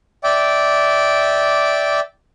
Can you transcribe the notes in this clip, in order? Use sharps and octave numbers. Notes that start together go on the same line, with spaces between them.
D5 E5 G5 D6